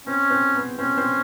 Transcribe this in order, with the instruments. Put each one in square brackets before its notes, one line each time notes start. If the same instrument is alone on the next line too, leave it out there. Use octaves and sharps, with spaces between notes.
[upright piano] C4 [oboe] C#4
[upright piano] C4
B3
[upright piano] C4 [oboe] C#4
[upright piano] C4